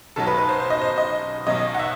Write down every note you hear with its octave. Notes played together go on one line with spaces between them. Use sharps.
B1 B2 F#3 A4
B4
B4
C5
C5
D#5
C5
D#5
B1 B2 F#3 D#5
F#5
E5